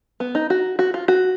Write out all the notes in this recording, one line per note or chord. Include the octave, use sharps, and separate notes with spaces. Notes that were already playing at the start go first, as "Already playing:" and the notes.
B3
D#4
F#4
F#4
F4
F#4